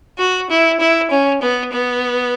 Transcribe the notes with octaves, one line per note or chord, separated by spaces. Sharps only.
F#4
E4
E4
C#4
B3
B3